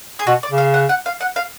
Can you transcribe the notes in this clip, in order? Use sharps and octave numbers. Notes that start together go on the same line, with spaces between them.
G#4
B2 F#4
D5
C#3
F5
F#5
F#5
F5
F#5
F5